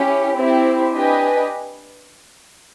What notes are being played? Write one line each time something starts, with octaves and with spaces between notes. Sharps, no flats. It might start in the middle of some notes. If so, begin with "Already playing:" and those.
Already playing: C#4 E4 G4
C4 E4 G4
D4 G4 B4 D#5 G#5